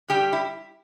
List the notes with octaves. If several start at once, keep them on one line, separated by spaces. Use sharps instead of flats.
G2 G3 G4
E4